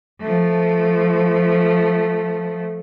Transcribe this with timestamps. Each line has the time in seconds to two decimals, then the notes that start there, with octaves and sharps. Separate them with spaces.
0.21 F3 A3